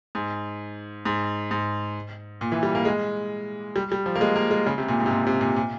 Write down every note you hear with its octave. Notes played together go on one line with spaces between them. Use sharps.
G#2
G#2
G#2
A#2
E3
G3
A#3
G#3
G3
G3
F3
A#3
G#3
A#3
G#3
C#3
C3
A#2
G#2
C3
A#2
C3
A#2
A#2